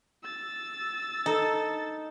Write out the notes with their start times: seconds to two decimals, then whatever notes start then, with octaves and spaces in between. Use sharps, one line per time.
0.23 E6 A6
1.26 D#4 A4